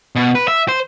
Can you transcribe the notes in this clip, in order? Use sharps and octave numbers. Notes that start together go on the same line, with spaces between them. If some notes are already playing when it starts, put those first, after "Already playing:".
B2
B4
E5
C5